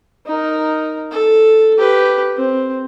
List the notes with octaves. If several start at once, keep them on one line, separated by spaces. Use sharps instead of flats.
D#4 A#4
A4
G4 B4
C4